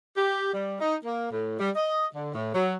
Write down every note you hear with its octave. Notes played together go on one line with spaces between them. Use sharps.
G4
G3
D#4
A#3
A2
G3
D#5
D3
A2
F#3